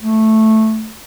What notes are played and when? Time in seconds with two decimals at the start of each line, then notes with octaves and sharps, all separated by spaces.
0.01 A3